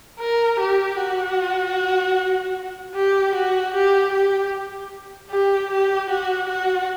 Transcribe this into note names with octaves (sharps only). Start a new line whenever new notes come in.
A#4
G4
F#4
G4
F#4
G4
G4
G4
G4
F#4
F#4